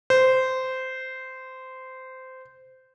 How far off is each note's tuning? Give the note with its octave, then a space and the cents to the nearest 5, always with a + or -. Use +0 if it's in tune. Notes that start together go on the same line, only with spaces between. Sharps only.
C5 -15